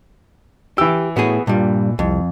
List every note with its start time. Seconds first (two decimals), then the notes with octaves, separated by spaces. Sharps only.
0.78 E3 G4 E6
1.17 A2 B3 F#4 G#4
1.47 G2 A#2 G3
1.99 C2 F2